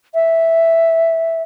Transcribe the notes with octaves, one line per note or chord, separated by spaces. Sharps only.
E5